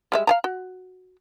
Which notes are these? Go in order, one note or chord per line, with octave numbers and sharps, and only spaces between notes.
G3 G#3 E5
F5 A5 A#5
F#4